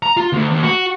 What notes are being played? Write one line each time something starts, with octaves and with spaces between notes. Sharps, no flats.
A#5
F4
D2
D#2
F#4